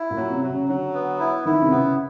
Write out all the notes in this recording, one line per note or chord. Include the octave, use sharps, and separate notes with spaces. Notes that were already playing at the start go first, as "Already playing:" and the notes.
Already playing: E4
A#2
F#3
C3
F#3
C#3
D3 F#3
B3
E4
D#3 E4
C3
C#3 B3